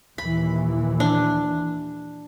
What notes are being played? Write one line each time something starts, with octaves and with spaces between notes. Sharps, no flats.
D#2 A#2 E3 B5
D4